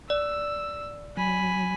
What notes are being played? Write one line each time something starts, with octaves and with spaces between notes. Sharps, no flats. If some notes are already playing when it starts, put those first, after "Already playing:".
D5 E6
F#3 G#5 B5